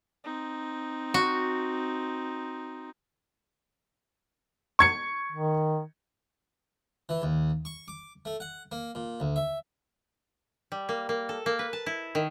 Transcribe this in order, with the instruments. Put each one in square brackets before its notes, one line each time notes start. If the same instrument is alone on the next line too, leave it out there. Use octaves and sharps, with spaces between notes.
[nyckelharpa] C4 D#4
[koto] F#4
[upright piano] C#6 G#6 C#7
[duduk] D#3
[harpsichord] E3
D#2
C#6
D6
A3
F#5
A#3
A#2
D2
E5
[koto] G3
A#3
A#3
A4
A#3
B4
A5
E4
D#3